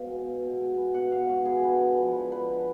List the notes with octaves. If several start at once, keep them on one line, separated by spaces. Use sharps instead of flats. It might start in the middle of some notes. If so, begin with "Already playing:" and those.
Already playing: B2 G#3 F5
B3
B2
B2
G#3
B3
B2 F#5
B2 F5
G#3 F#4
B3 G#4
D3 B4
D3
F3 B4
G#3
D3 B4
D3